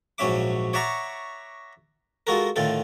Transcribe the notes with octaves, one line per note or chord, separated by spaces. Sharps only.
A#1 G#2 F#3 C#4 E5 D6
C#5 D5 E5 F#5 A#5 C#6
G#3 F4 F#4 A4 A#4
A2 D3 D#3 F4 A4